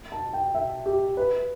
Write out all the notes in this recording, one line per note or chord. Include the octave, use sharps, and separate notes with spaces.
A5
G5
E5
G4
B4